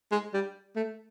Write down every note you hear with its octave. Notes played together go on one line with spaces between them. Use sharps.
G#3
G3
A3